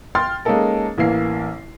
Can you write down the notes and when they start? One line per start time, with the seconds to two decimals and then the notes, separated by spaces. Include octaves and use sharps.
0.15 G5 C6 F6 A6
0.45 G#3 A#3 C#4 D#4 A4 A#4
0.98 A1 E3 A#3 C7